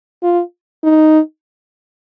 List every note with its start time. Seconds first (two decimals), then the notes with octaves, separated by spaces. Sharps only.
0.23 F4
0.84 D#4